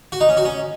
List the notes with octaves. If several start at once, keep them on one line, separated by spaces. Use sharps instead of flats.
F#4
D#4
C#4
F#4
C#4